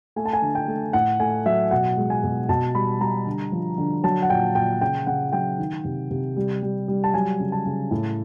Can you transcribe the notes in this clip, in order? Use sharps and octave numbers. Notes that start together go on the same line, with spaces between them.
A3 G#5
A5
G#5
D3
G5
A3
A2 F#5
A3 G#5
F#3 E5
B2 F#5
G#3
G#5
B2
B2 A5
G3 B5
G3 A#5
D3
F3
D3
F#3 A5
F#5
A#2 G5
A#2 G5
C#3 G5
C#3 F#5
F#3 G5
D#3
C3
C3
G3
G3
G3
A5
F#3 G#5
C#3
A5
C#3
A2